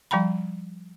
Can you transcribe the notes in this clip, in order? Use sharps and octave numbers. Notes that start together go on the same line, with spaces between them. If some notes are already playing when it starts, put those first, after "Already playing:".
F3 G3 G5 A#5 B5